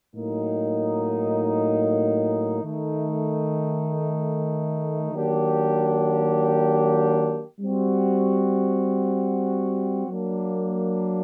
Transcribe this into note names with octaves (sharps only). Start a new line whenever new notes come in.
A2 F#3 A#3 D#4
D#3 A3 D#4
D#3 F#3 A#3 D4 G4
G3 C4 F#4
F#3 A#3 D4